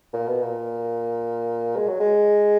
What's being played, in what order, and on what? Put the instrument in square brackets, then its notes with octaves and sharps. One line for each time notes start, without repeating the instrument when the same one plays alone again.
[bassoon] A#2
B2
A#2
G#3
F#3
G#3